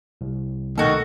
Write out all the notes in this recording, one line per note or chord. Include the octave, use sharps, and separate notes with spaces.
C2
B2 D#3 A3 A#3 F#4 A4